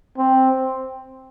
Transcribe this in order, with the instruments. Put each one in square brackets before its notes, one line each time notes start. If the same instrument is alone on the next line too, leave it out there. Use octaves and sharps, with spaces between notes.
[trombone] C4